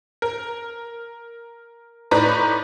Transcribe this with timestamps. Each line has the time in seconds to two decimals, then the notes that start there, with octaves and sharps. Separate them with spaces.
0.22 A#4
2.11 A2 D#4 B4 D5 A#5